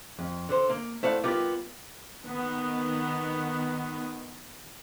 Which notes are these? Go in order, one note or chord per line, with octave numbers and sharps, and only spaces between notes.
F2
D3 C5
A#3
A3 E4 C5 D5 F5 F#5
G3 B3 D#4 F4 G4 A#4
D#3 B3